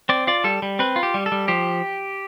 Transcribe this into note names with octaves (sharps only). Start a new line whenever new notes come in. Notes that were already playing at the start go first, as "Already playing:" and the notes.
C4 D5
F4 D5
G3 A4
G3
C4 B4
F4
G4
G3
A4
G3
F3 G4